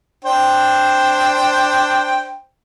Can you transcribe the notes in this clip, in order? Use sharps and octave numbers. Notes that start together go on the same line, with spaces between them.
D4 C5 G5